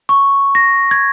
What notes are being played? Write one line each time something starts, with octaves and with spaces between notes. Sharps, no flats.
C#6
A#6
G#6